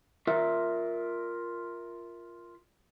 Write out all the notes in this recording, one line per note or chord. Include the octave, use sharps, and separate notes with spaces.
F4 A#4 E5